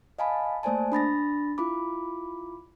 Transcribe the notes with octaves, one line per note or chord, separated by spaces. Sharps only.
D#5 F5 G#5 A5 B5
A3 A#3 C5 D5 G#5 A5
D4 B5 A6 A#6
E4 F4 B5 D6